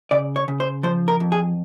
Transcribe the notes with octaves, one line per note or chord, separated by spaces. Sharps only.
C#3 D5
C#5
C#3
C5
F3 C5
A#4
F2
G#4